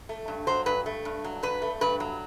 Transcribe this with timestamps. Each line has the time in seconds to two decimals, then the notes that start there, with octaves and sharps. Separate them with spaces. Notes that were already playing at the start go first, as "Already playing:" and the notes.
0.09 A3
0.28 G2
0.47 F#3 C5
0.66 G2 B4
0.86 A3
1.05 G2
1.24 F#3
1.43 G2 B4
1.62 A3
1.81 G2 B4
2.00 F#3